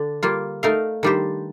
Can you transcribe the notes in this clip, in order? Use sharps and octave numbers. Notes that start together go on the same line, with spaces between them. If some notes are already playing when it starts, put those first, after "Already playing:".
Already playing: D3 D4
G3 A#3 F4
A3 D#4 A#4 F5
D#3 G3 D4 G4 C5